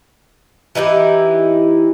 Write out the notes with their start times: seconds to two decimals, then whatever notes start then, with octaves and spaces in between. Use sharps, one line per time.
0.75 E3 D#4 E4 G4